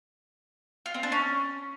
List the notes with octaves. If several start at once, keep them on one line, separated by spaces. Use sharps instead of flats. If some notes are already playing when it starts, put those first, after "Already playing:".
F4
C4
D4
C#4